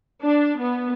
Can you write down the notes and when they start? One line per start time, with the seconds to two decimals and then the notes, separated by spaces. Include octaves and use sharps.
0.22 D4
0.58 B3